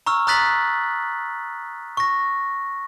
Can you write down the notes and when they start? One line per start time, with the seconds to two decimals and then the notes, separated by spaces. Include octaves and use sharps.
0.06 A#5 C#6 E6 F6
0.27 A#5 D#6 F#6 A6 B6 F#7
1.97 C#6 A#6